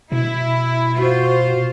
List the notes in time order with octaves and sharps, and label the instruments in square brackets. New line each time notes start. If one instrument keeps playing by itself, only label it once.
[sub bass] B2 [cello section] E4
[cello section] F4 C5 [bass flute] F#4